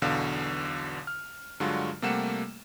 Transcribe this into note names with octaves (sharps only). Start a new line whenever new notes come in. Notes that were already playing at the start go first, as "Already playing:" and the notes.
B1 E2 B2 D3 F5
F6
G2 D3 F#3 G#3 F4 F#4
C3 G3 A3 A#3 F#5 E7